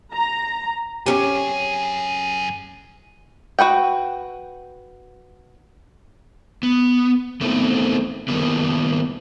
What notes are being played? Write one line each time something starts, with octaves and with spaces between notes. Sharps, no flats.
A#5
F#2 C#4 G4 G#4
F#4 B4 F#5 G5
B3
A3 B3 C4 D#4 A4
D#3 G3 A#3 B3